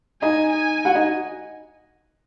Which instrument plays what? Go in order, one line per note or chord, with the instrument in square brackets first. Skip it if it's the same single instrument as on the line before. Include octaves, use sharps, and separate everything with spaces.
[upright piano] D#4 D#5 [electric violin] G#5
[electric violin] G#5
[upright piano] F#4 F#5
D#4 D#5